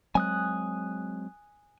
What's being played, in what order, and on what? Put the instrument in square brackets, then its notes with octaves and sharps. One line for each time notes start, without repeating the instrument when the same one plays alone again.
[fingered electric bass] F#3 G#3 C4 [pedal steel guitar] G#5 D#6 F#6